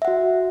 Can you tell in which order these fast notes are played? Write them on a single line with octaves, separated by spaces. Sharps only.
E5 F#5 F#4